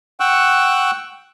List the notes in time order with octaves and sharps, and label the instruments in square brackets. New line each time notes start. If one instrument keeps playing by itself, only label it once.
[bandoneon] F#5 G5 C#6 E6 F#6